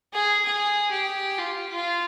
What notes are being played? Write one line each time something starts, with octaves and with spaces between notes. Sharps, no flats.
G#4
G#4
G4
F4
F4